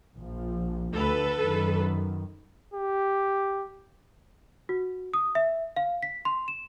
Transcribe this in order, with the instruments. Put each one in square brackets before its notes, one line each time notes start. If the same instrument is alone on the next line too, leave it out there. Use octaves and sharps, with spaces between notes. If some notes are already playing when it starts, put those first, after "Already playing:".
[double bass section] A#1 F3
[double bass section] D2 [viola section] A4 B4
[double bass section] F#2 D#3
[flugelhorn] G4
[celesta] F#4
D#6
E5
F5
B6
C6
E7